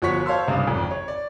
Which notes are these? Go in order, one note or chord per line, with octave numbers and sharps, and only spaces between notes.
G1 F3 F#4 C#5 C#6 B6
C5 C#5 F5 A5 C6 E6
C2 G2 C#3 F5
G#1 F2
C#5
D5